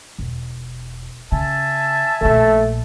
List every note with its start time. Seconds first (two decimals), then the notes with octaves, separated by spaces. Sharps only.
0.19 E1
1.32 C#3 E5 G#5 A5
2.21 A#1 A#2 A3